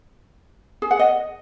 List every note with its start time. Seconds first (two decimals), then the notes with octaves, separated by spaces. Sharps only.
0.82 G#4
0.91 F#5
0.99 D#5